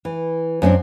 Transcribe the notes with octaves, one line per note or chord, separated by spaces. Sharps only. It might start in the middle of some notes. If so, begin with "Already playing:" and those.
E3
F#2 B3 C4 D4